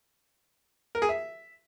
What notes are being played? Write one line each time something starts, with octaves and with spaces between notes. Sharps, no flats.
A#4
G#4
E5